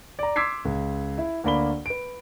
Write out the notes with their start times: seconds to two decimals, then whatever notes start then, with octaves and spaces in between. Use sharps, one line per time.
0.19 D5 A#5
0.36 C6 D6 E6 G#6 B6 C7
0.65 C#2
1.18 E4
1.44 D2 A#3 D5 B5 G7
1.86 B4 D7